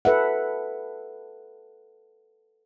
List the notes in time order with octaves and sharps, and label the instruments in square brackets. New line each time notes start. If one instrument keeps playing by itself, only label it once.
[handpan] A4 B4 E5 F#5